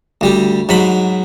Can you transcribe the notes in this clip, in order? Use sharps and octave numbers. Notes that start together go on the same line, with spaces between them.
D2 G3 G4
G#2 F#3 B5 C6